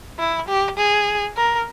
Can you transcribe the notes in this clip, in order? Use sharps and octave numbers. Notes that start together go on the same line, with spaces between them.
E4
G4
G#4
A#4